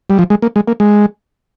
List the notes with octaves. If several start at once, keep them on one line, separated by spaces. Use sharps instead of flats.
G3
F3
G#3
A#3
G#3
A#3
G#3